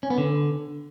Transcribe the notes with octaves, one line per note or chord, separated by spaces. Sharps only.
C#4
B3
D3